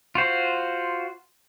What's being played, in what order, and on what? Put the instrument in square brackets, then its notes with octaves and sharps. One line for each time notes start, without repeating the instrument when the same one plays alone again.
[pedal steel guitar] F4 F#4 C5